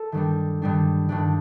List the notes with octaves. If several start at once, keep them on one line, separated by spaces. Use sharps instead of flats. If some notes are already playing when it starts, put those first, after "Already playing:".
Already playing: A4
G2 D#3 G3 D4
G2 D#3 G3 D4
G2 D#3 G3 D4